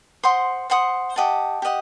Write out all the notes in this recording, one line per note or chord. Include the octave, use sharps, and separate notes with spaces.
C5 F#5 C6 D#6
C5 F#5 C6 D#6
G4 D#5 F#5 A5
G4 D#5 F#5